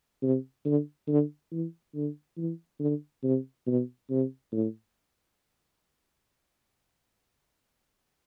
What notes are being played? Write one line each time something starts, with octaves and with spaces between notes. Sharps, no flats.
C3
D3
D3
E3
D3
E3
D3
C3
B2
C3
A2